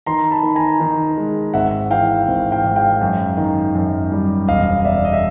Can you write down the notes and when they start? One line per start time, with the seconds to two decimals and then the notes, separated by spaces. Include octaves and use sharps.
0.06 D#3 A#5 C6
0.31 A5 B5
0.43 D#3
0.56 G#5 A#5
0.80 D#3
1.17 G#3
1.54 G#1 E5 F#5
1.90 E3 F5 G5
2.28 G#1
2.52 F5 G5
2.64 G#2
2.76 F5 G5
3.01 F#2
3.37 D#3
3.75 F#2
4.12 G3
4.48 E1 D#5 F5
4.85 E1 D5 E5
4.97 D5
5.05 D#5
5.13 E5